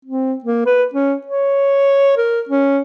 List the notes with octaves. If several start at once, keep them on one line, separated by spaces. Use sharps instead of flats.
C4
A#3
B4
C#4
C#5
A#4
C#4